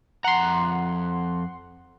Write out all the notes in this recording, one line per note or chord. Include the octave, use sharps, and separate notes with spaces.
F2 F#5 A#5 C6